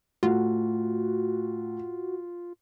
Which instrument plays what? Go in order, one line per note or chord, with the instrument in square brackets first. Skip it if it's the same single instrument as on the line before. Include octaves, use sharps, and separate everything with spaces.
[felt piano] A2 [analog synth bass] F4 [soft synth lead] F#4